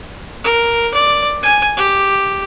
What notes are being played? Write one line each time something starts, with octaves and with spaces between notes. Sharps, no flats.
A#4
D5
G#5
G4